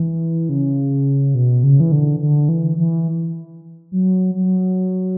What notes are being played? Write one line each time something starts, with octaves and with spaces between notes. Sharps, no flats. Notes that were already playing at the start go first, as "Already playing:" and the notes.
Already playing: E3
C#3
B2
C#3
E3
D3
D3
E3
E3
F#3
F#3